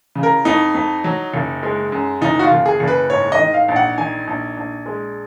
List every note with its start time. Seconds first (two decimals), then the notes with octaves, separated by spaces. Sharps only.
0.15 C#3
0.23 A#4
0.45 F2 D#4
0.75 F2
1.04 F#3
1.33 F#1
1.63 G#3
1.92 F#2
2.21 F#1 D#4
2.39 F#4
2.43 F4
2.51 F#1
2.66 G#4
2.80 F#1
2.88 B4
3.10 G#2 C#5
3.32 D#5
3.39 D#3
3.54 F5
3.68 A#1
3.76 F#5
3.98 D#3 G#5
4.27 A#1
4.57 A#1
4.86 G#3